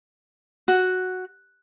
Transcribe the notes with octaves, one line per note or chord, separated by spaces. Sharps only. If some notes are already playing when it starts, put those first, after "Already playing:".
F#4